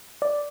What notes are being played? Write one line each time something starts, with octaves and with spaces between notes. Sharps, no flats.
D5